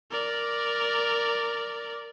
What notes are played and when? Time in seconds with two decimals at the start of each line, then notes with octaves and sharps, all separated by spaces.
0.11 A#4 D5